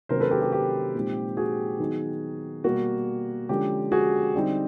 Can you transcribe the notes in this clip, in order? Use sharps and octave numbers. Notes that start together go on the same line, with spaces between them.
C3 D#3 F#3 A#3 C#4 A#4 C5
A4 B4
G4 A4
G4
G4
A#2 F3 G#3 C4 D#4
F#4 G#4
D#3 F#3 B3 D#4
B2 G3 A#3 F#4
D3 F3 G#3 C#4 G4
F#4 G#4
D3 G3 C4 D#4